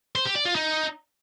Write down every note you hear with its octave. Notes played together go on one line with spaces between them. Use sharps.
C5
G4
D5
F4
D#4